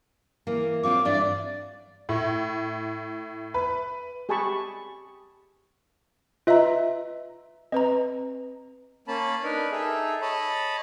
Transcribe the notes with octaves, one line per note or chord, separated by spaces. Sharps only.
E3 A#3
C4 F4 C#5 D6
G2 E3 D4 D5
A2
B4
G4 G#4 G#5 A5 B5 C#6
F4 B4 D#5 E5 A#5
C4 B4 D#5 A#5
A#3 C#4 A5 B5
D4 D#4 A#4 B4
D#4 G#4 A4 E5
C#5 D#5 A5 B5